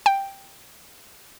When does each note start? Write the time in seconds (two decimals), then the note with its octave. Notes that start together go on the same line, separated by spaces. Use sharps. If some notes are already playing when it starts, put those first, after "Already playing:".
0.06 G5